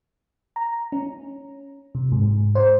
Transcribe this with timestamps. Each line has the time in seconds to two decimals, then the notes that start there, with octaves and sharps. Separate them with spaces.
0.56 A#5
0.92 C#4
1.95 C3
2.12 G#2
2.55 C5